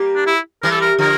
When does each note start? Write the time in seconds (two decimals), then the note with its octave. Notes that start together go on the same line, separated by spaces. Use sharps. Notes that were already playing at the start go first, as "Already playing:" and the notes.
Already playing: G3 A#3
0.15 D4
0.26 E4
0.63 E3 G3 A#4
0.71 A4
0.81 A#4
0.98 D3 F3 A#4